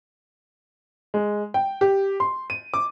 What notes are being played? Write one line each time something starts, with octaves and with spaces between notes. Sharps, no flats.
G#3
G5
G4
C6
D#7
D6